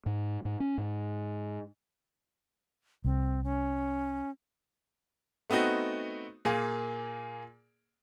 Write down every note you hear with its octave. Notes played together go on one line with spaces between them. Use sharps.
G#2
G#2
C#4
G#2
C2 C4
C#4
A3 B3 C4 D#4 F#4
A#2 A#3 G#4